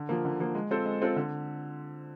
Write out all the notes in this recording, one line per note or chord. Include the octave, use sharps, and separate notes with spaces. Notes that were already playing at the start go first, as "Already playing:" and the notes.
Already playing: D3
F3 A#3
D3
F3 A#3
G#3
C4 F4 A4 C5
G#3
C4 F4 A4 C5
D3